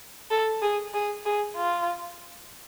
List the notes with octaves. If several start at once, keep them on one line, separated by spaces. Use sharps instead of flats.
A4
G#4
G#4
G#4
F4